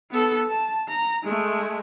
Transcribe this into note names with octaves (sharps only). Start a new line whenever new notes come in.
B3 A4
A5
A#5
G#3 A3